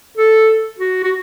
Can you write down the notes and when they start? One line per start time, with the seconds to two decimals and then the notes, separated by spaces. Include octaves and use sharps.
0.17 A4
0.79 F#4
1.04 F#4